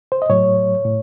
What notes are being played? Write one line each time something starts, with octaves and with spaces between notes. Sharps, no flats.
C5
D#5
A2 F#3 C#5
A2